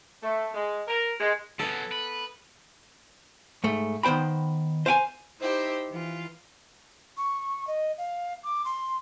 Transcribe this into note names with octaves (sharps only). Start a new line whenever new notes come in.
A3
G#3
A#4
G#3
C#3 F#3 B3 A4
B4
G#2 A3
D#3 B3 C5 G5 B5
C5 F5 G5 G#5
D#4 E4 G4 C5
E3 F4
C#6
D#5
F5
D6
C6